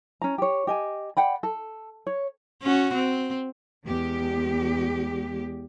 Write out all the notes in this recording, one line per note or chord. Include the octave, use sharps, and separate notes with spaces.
C#4 A#5
G4 C#5
G4 D#5 G#5
D5 F#5 G5 B5
A4
C#5
C#4 F#4
C4
E2 G#3 G4